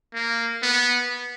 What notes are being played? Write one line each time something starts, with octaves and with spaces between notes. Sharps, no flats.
A#3
B3